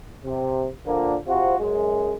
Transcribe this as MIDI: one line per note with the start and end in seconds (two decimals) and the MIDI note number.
0.24 0.68 48
0.85 1.15 46
0.85 1.15 50
0.85 1.15 53
0.85 1.15 58
0.85 1.15 62
1.27 1.56 48
1.27 1.56 60
1.27 1.56 65
1.27 1.56 66
1.58 2.13 42
1.58 2.13 56